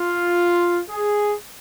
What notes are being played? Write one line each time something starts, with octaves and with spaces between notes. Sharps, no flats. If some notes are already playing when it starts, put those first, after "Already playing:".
Already playing: F4
G#4